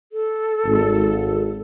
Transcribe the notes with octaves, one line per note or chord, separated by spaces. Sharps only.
A4
G#1